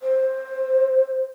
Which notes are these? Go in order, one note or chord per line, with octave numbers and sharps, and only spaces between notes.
C5